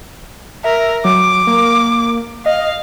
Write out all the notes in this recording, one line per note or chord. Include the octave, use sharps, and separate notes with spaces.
A#4 E5
F#3 D6
A#3
D#5 F5